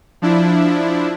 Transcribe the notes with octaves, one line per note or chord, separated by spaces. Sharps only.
F3 D4 E4